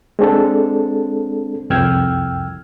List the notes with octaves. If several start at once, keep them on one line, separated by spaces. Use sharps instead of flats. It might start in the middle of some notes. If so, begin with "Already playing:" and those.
G#3 C4 D4 A4
C2 F2 G5 E6 F6 G#6